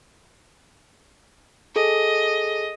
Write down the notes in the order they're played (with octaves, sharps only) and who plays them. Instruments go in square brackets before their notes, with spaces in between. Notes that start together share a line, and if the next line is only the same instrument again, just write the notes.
[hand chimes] G#4 A4 [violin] D#5